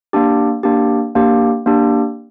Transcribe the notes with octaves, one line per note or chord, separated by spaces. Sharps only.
A#3 D4 G4
A#3 D4 G4
A#3 D4 G4
A#3 D4 G4